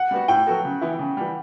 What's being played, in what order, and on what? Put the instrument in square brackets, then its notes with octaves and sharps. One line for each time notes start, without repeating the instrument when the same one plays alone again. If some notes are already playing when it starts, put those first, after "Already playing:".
Already playing: [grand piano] F#5
[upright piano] G3 B3 F#4
[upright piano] A2 [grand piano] G5
[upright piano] F#3 B3 F#4 A4
C#3
E3 B3 E4
C#3
E3 G3